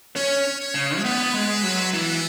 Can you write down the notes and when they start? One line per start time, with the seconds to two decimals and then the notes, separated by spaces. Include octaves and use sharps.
0.16 C#4 C#5
0.60 C#5
0.75 C#3
0.98 G#3
1.04 B3 B4
1.34 G#3
1.63 F#3
1.93 E3 B3